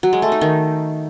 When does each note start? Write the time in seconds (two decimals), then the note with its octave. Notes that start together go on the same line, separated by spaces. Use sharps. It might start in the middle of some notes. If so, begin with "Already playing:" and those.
0.03 F#3
0.13 G#3
0.22 A3
0.32 D#4
0.41 D#3